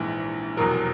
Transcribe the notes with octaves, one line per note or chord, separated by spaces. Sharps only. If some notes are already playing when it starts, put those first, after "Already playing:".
Already playing: A#1 G#2 E3
F1 E2 B2 F#3 A#4